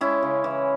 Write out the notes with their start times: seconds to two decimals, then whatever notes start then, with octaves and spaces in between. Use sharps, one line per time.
0.01 G#3 C#4 E4
0.23 C#3
0.44 E3